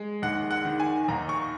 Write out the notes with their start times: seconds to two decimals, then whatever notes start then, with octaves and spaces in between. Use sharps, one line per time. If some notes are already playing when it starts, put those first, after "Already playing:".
Already playing: G#3
0.22 D#2 F#5
0.51 F#5
0.65 D#3
0.80 G#5
1.08 D#2 A#5
1.29 C#6